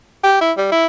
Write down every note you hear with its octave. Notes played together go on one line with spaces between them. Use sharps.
G4
E4
G3
E4